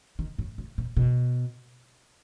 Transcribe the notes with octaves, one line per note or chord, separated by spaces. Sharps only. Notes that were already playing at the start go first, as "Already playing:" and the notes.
D#3
A2
A2
A#2
B2